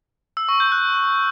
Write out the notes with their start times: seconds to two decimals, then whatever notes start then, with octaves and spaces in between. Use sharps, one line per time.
0.37 E6
0.48 C#6
0.60 G6
0.72 F#6